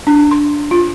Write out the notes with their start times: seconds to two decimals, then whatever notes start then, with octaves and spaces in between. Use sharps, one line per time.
0.07 D4
0.31 C6
0.71 F4